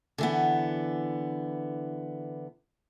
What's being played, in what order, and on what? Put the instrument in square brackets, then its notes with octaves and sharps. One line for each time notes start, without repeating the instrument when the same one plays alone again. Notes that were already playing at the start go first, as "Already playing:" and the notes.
[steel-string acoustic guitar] D3 E3 B3